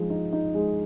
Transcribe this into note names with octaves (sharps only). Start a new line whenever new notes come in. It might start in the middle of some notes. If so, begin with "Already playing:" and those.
Already playing: F3 G#3 D#4
D#4
D#4
G#3